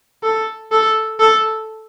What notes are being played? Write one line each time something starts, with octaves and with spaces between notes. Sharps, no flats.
A4
A4
A4